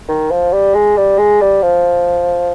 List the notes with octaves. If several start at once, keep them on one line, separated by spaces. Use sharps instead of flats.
D#3
F3
G3
G#3
G3
G#3
G3
F3